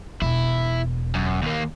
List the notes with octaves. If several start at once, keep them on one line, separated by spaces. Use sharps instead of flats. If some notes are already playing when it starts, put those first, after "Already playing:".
E1 E4
F#2
D#2 A#3